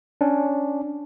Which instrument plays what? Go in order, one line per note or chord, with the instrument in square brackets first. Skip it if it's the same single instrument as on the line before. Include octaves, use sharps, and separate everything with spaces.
[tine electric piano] C#4 D4